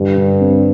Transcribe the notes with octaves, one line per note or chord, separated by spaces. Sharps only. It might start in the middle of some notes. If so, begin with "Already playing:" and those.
Already playing: G2 D3
D3
C4